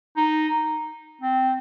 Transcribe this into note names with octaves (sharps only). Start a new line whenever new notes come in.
D#4
C4